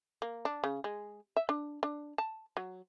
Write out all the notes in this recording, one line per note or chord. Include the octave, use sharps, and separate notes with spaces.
A#3
D4
C#3
G#3
E5
D4
D4
A5
F#3